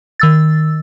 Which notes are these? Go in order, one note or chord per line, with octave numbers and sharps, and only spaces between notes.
D#3 E6 A6